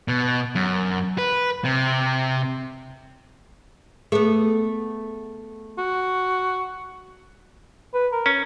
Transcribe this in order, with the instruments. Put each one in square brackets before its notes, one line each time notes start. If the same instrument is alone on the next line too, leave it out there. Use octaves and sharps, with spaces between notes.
[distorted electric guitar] B2
F#2
B4
C3
[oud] A3 B3 [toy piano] G#4 A4
[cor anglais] F#4
B4
A#4
[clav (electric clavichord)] C#4